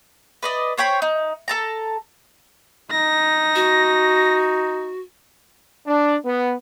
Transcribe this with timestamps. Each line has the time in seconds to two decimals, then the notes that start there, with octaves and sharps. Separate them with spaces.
0.42 B4 D5 D#5
0.78 C5 C#5 G5 B5
1.02 D#4
1.48 A4 A5 A#5
2.91 D#4 A#6
3.55 F#4
5.87 D4
6.25 B3